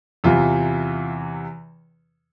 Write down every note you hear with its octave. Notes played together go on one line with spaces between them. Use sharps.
E2 C3 E3 F4